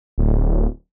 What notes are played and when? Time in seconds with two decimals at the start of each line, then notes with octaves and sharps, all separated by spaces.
0.18 D1